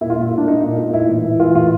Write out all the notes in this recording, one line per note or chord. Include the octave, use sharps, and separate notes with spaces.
A#2 E4
F4
A#2 E4
A#2
D4
A#2 D#4
A#2
A#2
A2 E4
E3
E3
E3 F4
A2 F4